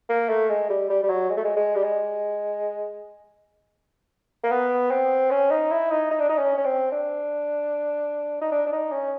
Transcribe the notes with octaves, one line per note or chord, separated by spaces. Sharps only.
A#3
A3
G#3
G3
G3
G3
F#3
G#3
A3
G#3
G#3
G3
G#3
A#3
B3
C4
C#4
D#4
E4
D#4
D#4
D4
D#4
C#4
C#4
C4
D4
D#4
D4
D4
D#4
C#4